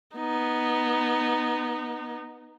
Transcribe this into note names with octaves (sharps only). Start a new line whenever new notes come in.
B3 D#4